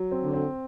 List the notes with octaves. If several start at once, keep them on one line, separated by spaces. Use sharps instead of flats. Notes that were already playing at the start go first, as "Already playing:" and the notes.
Already playing: F#3
C4
D3
C4